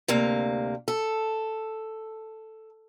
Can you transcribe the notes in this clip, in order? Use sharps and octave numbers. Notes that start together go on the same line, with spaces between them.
D2 C3 A#3
A4